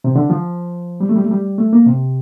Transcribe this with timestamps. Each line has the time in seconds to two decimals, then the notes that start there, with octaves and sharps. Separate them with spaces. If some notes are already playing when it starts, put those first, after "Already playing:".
0.04 C3
0.16 D3
0.30 F3
1.00 G3
1.09 A3
1.16 G3
1.24 A3
1.31 G3
1.58 A3
1.73 A#3
1.86 C3